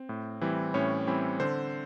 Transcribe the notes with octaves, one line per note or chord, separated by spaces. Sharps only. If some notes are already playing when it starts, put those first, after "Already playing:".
Already playing: C4
A2
E3 G3 C4 E4
A2 C#4 C#5
E3 G3 C4 E4
D3 C4 C5